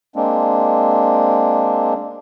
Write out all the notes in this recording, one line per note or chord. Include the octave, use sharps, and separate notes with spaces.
G#3 A#3 C4 D4